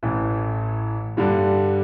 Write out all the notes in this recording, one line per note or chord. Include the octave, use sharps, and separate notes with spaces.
A1 A2 E3
G2 D3 G3